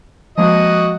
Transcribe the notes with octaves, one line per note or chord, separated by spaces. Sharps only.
F3 G#3 A#3 F#4 D#5